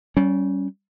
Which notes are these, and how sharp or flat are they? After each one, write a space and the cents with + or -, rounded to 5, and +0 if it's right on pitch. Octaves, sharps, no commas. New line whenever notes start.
G3 -25 C#4 +0